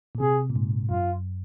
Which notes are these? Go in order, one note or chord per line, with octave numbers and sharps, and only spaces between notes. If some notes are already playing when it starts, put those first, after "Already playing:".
A#2
C3 G#4
A#2
G#2
F#2 F4